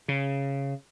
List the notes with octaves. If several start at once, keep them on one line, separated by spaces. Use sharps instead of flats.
C#3